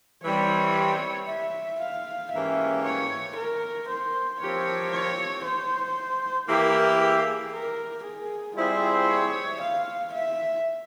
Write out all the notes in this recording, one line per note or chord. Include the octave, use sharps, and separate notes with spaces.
E3 G3 C4 C#5
E5
F5
G#2 E3 A#3 C#4 G4 E5
C#5
A#4
C5
F3 C4 G4 A#4 C#5
C#5
C5
E3 A#3 E4 G4 A#4
G#4
A#4
G#4
G3 C4 E4 F4 G#4 C5
C#5
F5
E5